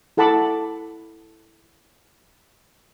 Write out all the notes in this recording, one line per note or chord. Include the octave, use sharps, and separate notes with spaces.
E4 A4 F#5 A5 B5 D6